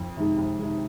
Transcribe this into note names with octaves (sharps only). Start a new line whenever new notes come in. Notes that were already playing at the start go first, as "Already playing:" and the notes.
Already playing: F2
C3 D#3 G#3
F2
C3 D#3 G#3